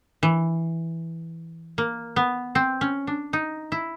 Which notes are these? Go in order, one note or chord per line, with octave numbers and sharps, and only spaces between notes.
E3
A#3
B3
C4
C#4
D4
D#4
E4